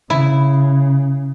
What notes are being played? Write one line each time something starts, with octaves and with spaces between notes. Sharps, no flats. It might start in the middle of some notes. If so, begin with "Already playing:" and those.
C#3 E4